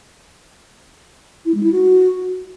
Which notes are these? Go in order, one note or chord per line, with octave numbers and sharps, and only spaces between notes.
E4
G#3
E4
F#4